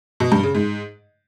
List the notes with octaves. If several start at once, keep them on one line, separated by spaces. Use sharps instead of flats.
B2
G2
C#3
G#2